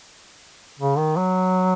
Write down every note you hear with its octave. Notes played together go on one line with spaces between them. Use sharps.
C#3
D#3
F#3